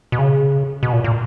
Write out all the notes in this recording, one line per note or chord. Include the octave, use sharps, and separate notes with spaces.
B2
C#3
B2
A#2
A#2